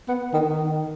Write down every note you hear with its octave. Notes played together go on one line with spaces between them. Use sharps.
B3
D#3
D#3